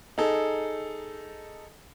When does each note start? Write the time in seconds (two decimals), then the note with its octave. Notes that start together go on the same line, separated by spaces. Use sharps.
0.18 D#4 G#4 A4